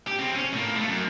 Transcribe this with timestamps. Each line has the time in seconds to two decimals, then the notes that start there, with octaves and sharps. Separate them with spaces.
0.07 G4
0.19 C#3 C4
0.35 C#4
0.53 A2 A#3
0.76 G#3 A3
0.88 F#2